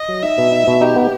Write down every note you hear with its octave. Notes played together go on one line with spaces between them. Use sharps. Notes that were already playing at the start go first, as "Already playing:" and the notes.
Already playing: D#5
F#3
D#4 E5
B2
D#4
B2
D#4 G4
B3